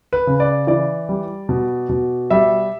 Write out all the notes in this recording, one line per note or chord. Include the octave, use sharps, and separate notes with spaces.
B4
C#3
D5
E3 D5
G3
B2
B2
G3 E5